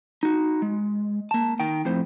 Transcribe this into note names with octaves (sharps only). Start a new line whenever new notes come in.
D#4 F#4
G#3
A#3 A5
D#3 G5
F2 A2 C5